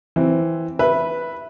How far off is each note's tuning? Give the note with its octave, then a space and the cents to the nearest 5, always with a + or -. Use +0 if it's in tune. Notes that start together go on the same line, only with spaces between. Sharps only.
E3 +0 C4 +0
B4 -10 E5 +0